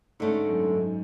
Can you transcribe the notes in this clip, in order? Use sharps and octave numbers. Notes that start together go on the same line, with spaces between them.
G#2 D3 A3 C#4
F#2
F#2
G#2